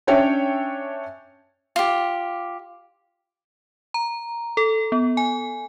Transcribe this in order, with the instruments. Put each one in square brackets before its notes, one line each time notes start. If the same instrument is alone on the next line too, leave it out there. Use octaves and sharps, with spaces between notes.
[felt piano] C#4 D4 C#5 E5 G5
[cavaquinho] F4 G4
[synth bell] A#5
A4
B3
G#5